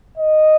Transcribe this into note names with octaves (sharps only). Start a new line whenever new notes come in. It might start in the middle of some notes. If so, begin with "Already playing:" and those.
D#5